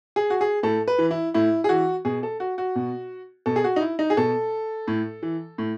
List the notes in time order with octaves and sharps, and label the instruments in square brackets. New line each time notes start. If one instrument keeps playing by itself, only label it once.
[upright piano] G#4
F#4
G#4
A2 A4
B4
E3
E4
A2 E4
G#4
E3 F#4
B2 G#4
A4
F#4
F#4
B2
B2 A4
G#4
F#4
D#4
E4
D#4
G#4
B2 A4
A2
E3
A2